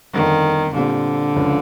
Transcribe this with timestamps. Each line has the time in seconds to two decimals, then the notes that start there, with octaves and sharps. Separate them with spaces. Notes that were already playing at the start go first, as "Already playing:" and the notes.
0.14 G1 F2 D3 D#3
0.74 A#2 D3 G3 C4
1.36 C#2 C#3 F3